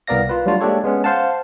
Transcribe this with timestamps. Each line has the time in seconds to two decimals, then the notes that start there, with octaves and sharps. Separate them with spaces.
0.07 C2 B3 A#4 D5 F5 A#6
0.29 F4 B4
0.46 F#3 G3 A3 D4 F4 F#4
0.61 G#3 A#3 D4 G4 A4 C#5
0.84 G#3 B3 C#4
1.04 C5 F5 F#5 A5